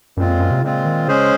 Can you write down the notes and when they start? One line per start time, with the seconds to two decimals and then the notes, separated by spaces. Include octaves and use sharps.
0.17 F#2 A#2 G#3 C4 F4
0.28 F2
0.40 F#2
0.51 C3
0.62 A#2 C#3 G#3 C4 F4
0.85 D#3
1.08 C#3 G#3 C#4 G#4 C5